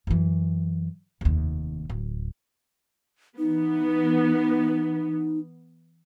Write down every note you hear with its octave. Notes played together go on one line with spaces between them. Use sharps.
F#2 E3
F1 D#2
D1
E3 B3 D#4